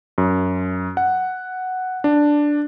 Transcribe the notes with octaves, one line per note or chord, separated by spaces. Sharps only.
F#2
F#5
D4